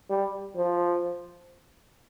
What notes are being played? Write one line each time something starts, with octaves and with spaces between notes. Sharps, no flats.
G3
F3